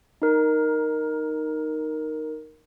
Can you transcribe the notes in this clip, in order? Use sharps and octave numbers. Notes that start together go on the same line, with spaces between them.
D#4 A#4